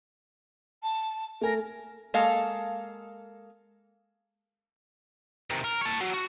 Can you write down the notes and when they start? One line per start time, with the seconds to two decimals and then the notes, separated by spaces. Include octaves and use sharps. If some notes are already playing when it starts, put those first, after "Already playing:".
0.83 A5
1.41 A3 A#4 G#5
2.14 G#3 A#3 A4 F5
5.50 C3 D#3
5.64 A#4
5.81 C#5 A5
6.00 F#3
6.13 F#4